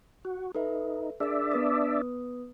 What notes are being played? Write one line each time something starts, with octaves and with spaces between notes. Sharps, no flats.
F#4
D#4 A4 B4 E5
D4 G#4 A#4 D5 E5 E6
B3 B4 D#6